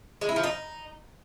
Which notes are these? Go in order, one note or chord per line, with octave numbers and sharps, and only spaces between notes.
G#3
E4
F3
D#4